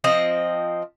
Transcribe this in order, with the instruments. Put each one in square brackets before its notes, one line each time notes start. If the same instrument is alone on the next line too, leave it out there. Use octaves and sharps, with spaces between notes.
[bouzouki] F3 C4 D#5